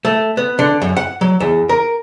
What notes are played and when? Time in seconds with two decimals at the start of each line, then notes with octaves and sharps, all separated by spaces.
0.05 A3
0.37 B3
0.59 D3
0.82 F#2
0.97 F#5
1.21 F#3
1.40 E2
1.69 A#4